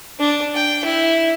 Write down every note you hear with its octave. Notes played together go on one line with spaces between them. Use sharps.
D4
G5
E4